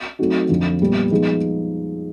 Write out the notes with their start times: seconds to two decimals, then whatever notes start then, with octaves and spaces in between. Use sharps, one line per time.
0.19 F#3 A3 C4 D#4 F#4
0.49 F2 D3 F3
0.80 A#2 G3 B3
1.11 F3 G#3 B3 D#4 G#4